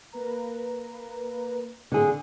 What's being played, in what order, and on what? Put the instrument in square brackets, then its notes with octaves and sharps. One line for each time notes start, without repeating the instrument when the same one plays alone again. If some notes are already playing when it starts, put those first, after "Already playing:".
[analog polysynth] A#3 B4 A#5
[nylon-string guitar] D3 G#4